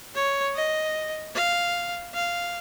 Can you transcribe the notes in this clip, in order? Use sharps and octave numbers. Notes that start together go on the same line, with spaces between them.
C#5
D#5
F5
F5